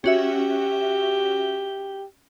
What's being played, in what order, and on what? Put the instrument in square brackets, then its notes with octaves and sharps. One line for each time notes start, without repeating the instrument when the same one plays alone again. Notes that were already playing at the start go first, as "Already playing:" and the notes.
[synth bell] C#4 F#4 E5 [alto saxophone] G4